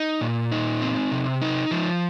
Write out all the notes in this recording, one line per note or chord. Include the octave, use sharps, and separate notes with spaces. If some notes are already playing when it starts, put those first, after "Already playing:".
Already playing: D#4
A#2
D#4
C4
C3
D#4
F3